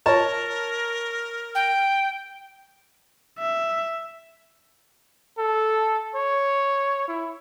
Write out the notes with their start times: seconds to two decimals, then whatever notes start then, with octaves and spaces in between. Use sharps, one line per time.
0.06 A#4 C#5 A5
1.55 G5
3.38 E5
5.38 A4
6.16 C#5
7.08 E4